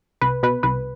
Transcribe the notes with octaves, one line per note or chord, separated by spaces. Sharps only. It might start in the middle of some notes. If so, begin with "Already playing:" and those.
C2 B4
B2 B4
C2 B4